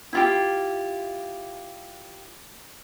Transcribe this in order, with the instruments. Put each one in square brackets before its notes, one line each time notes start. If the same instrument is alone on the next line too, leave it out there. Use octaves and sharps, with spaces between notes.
[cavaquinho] E4 F4 G4